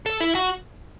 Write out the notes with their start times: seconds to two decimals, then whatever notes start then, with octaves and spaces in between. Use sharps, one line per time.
0.06 A4
0.20 E4
0.35 F#4